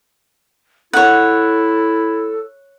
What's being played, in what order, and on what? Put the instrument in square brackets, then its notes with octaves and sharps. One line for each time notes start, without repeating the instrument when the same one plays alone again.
[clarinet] E4 [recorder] A4 [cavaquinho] C#5 F#5